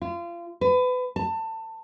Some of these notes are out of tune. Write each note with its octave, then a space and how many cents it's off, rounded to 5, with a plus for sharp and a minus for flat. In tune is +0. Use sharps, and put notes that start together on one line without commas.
F4 -30
B4 +30
A5 +25